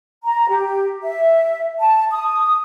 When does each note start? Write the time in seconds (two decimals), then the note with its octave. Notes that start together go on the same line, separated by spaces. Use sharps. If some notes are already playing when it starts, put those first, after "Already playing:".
0.24 A#5
0.48 G4
1.03 E5
1.80 A5
2.11 D#6